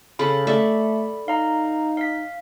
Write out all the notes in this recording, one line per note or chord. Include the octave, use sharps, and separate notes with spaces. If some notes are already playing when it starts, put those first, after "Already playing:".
C#3 A4 B5
A3 A4 D5 E5
D#4 F5 A#5
F5 B6